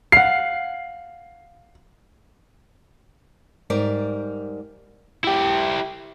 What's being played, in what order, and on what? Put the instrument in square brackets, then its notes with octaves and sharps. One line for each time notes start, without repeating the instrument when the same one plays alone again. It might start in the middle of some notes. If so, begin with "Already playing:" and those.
[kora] F5 F#5 [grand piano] C7
[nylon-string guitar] G#2 G3 A#4 D5
[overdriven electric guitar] E4 G4